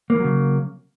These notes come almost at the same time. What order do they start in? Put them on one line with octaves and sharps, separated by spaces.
A#3 E3 F#3 C#3